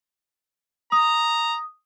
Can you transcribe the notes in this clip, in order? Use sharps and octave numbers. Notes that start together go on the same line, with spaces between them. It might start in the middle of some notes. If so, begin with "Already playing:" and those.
A#5 D#6